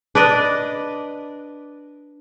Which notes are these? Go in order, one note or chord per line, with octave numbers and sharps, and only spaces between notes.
D4 B4 D5 D#5